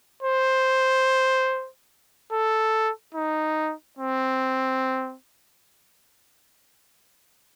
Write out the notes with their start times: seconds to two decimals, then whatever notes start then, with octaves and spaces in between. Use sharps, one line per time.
0.23 C5
2.32 A4
3.15 D#4
3.99 C4